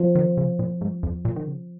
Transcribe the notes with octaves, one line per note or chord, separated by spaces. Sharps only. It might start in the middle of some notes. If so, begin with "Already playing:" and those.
Already playing: F3
D#3
C#3
A#2
G#2
F2
A#2
D#3
C#3